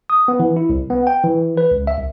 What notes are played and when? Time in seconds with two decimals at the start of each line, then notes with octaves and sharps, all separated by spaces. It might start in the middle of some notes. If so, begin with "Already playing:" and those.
0.10 D#6
0.28 B3
0.40 E3
0.56 E4
0.70 C2
0.90 B3
1.07 G5
1.24 E3
1.57 B4
1.71 C#2
1.87 E5
1.99 C2